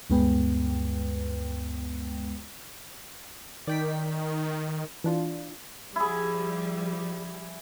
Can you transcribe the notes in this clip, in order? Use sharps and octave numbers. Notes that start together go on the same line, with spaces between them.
D2 G2 G#3 B3 B4 G5
D#3 D5 G5 B6
E3 D4 F4
F3 G3 E4 G#4